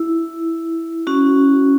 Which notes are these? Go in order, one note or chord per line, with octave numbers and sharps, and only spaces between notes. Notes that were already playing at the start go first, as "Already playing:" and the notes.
Already playing: E4
C#4 F#4